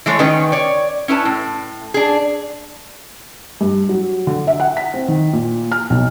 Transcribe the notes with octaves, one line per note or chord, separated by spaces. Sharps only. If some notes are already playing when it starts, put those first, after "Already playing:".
E3 G#3 A3 C5 C#5
D#3 C#4 B4 G5
C#5 D5
C#4 E4 B4 A5
A2
D4 G#4
G2
F#3
D3
E5
F#5
B6
C4
D#3
A#2
F6
B1